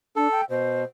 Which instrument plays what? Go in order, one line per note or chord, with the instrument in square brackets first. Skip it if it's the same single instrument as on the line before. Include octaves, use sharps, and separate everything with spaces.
[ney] D4 [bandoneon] A4
[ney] G5
[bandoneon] B2 [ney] C5